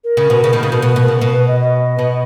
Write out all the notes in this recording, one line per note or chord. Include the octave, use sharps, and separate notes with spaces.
A#4
C#3
B2
C#3
B2 D#3
C#3
B2
B2 B4
B2
A#4
C#3
B2 B4
B4
D#5
D#5
B2